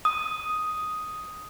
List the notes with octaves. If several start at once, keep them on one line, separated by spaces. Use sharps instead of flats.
D#6